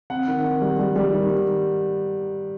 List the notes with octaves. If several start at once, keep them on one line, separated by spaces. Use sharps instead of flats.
C4 F#5
D#3
D#3
G3
G3
G3
D#3